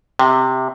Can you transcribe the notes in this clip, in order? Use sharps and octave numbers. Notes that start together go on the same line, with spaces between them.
C3